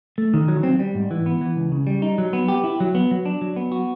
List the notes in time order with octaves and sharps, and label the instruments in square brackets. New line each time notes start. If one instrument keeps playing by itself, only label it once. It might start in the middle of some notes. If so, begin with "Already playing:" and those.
[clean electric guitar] A3
D#3
F#3
C4
G3
G#2
E3
B3
E3
C#2
C#3
G3
D#4
F#3
B3
G4
E4
F#3
B3
F#3
D4
F#3
B3
F#4